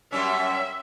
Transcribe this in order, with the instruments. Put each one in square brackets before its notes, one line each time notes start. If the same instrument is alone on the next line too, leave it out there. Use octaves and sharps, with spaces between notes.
[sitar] F#2 G3 C#4 [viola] E5